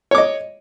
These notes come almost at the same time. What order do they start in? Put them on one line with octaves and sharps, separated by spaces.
C#5 D6 D#5